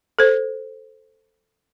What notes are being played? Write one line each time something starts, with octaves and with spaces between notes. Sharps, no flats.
A4 C5